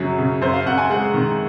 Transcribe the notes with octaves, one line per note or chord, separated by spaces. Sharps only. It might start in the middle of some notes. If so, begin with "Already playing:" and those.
Already playing: F#2 C#3 F#3
C#3
F#2 C5
F5
F#2 F#5
G#5
G#3 F#5
D#3